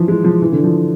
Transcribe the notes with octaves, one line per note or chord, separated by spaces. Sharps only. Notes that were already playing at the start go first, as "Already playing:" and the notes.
Already playing: E3 F3
G#3
F3
E3
D3
F3